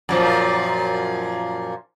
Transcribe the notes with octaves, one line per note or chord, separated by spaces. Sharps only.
F#2 A#2 F3